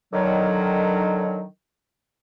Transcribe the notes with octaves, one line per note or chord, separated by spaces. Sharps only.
D3 D#3 F#3